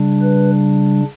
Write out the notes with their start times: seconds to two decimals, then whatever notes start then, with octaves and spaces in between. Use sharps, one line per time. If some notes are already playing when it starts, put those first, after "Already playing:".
Already playing: C#3 G3 D4
0.21 B4